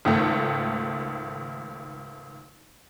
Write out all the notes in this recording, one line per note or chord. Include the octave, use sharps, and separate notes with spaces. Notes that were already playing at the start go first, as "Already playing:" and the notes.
G#1 C#2 D#3 A3